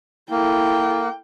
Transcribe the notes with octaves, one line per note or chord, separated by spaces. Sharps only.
A#3 E4 A4 G5